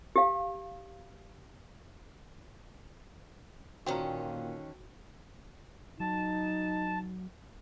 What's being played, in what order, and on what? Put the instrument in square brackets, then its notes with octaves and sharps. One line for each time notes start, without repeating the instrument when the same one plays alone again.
[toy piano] G4 F5
[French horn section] A#2 [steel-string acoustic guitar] D3 D#3 C#4 [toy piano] F#4 [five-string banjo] A#4 C5 G5
[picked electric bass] F#3 [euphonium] D#4 [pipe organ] A5